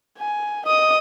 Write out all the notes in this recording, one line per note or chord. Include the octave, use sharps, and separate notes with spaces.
G#5
D#5 D#6